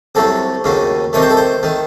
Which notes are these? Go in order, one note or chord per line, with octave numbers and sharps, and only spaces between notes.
C2 C3 F#3 A3 A4
D#2 C#3 F#3 A3
C2 C3 D#3 A3 C#5
C5
A4
C5
D#3 A3